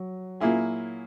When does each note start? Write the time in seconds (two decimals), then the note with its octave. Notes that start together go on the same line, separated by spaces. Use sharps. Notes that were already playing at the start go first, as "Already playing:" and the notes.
Already playing: F#3
0.40 A#2 A#3 E4 G#4